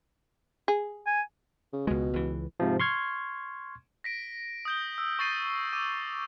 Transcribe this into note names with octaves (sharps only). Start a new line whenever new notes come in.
G#4
G#5
C#3
C#2 B2 G#3
C#2 E3
G#2 C3 F3
C6 C#6 F6 G#6
A#6 B6 D7
D#6 G6 G7
E6
C#6 D#6 A6 C7 D#7
D6 E6 D#7